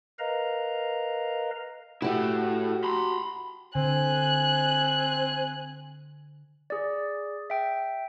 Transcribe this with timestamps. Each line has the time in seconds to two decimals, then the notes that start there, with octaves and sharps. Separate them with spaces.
0.19 A#4 B4 D#5 F5 A#5
2.02 A2 E4 F#4 G4
2.84 B5 C6
3.75 D3 C4 G#5 F#6
6.70 G#4 D5
7.50 E5 G5